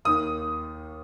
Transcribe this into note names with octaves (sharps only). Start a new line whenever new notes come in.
D#2 D#3 D#6